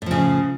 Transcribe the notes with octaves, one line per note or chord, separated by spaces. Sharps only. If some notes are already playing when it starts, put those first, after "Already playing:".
A2 C#3 F3